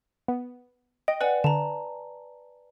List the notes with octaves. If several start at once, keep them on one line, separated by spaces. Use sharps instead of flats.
B3
D#5 G5
B4 D5 F#5 G#5
D3 A5 A#5